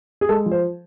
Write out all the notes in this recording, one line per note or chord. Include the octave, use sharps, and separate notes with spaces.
G#4
G#3 A4
F3
C5